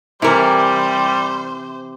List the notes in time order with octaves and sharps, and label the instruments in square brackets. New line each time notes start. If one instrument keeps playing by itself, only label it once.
[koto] C3 E3 [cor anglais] G3 [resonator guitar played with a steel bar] E4 A#4 [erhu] C5